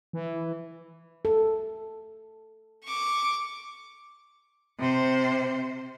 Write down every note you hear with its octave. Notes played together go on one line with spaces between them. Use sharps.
E3
A4
C#6 D6
C3 C5